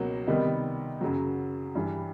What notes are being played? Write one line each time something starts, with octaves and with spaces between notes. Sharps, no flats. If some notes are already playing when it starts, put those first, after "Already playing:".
Already playing: C#2 B2 F#3 A#3
C3 D#3 G3 B3 D#4
F#2 C#3 F#3
G2 E3 G3